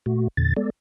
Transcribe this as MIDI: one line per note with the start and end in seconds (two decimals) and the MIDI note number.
0.06 0.28 46
0.06 0.28 57
0.06 0.28 66
0.37 0.54 40
0.37 0.54 46
0.37 0.54 50
0.37 0.54 93
0.57 0.70 56
0.57 0.70 59
0.57 0.70 69
0.57 0.70 74